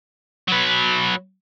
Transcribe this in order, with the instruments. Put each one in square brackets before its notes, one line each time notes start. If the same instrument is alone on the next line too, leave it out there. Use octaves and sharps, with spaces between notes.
[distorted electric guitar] F#3 B4